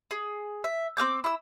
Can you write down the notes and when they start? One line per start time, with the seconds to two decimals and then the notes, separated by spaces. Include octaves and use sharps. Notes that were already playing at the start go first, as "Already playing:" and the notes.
0.11 G#4
0.64 E5
0.97 C4 A#4 D6 G6
1.24 E4 E6